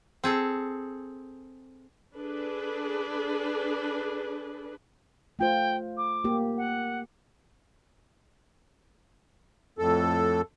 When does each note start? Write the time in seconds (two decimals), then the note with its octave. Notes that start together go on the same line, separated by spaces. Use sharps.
0.24 C4 G#4 A4
2.16 D4 G#4 A4 B4
5.39 A3 F4 C5 G5
5.97 D6
6.24 A#3 G4
6.57 F#5
9.78 F2 A2 A4